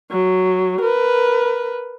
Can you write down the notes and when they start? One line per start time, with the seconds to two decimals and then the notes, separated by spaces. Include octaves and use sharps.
0.11 F#3
0.82 A#4 B4